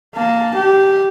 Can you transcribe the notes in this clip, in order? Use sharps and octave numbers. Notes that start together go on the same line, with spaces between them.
A#3 A5
G4